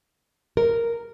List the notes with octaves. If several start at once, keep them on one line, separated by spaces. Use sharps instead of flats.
A#4